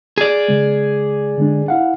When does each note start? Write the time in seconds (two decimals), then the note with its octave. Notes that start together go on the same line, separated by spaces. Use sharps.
0.18 G#4 D5
0.48 C#3 G#3
1.38 D3 G#3 D4
1.68 E4 F5 F#5